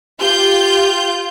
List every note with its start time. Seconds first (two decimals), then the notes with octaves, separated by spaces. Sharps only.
0.20 F4 G4 G6